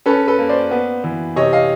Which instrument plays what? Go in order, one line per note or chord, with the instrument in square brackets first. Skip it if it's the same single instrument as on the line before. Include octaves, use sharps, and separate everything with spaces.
[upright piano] C#4 A4 B4
A4 B4
A#3
C5 D5
B3
E3
C3 C#5 D#5
D#5 F5